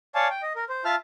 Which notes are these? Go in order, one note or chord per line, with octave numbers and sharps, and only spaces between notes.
C#5 D5 F5 G#5 A5
G5
D#5
A#4
C5
F4 E5 A5 F6